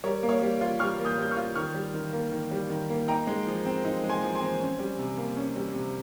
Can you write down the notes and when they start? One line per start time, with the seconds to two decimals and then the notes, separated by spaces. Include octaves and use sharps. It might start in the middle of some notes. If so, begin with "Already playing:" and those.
0.04 G3 A#4 C#5
0.23 A#3
0.29 C#5 F5
0.42 G3
0.61 F4
0.79 G3 C#6 F6
0.99 A#3
1.05 D#6 G6
1.18 G3 G6
1.31 C#6 F6
1.37 F4
1.55 D#3 C#6 F6
1.74 G3
1.94 D#3
2.13 A#3
2.32 D#3
2.51 G3
2.70 D#3
2.90 A#3
3.08 D#4 G5 A#5
3.27 G#3
3.47 F3
3.65 C4
3.85 D#4
4.04 G#3
4.09 G#5 C6
4.22 F3
4.35 G#5 C6
4.42 C4
4.61 C#4
4.79 G3
4.98 C3
5.18 A#3
5.37 C#4
5.56 G3
5.74 C3